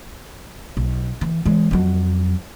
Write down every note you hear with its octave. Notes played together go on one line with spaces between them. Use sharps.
B1
E3
E3 G#3
F2 F#3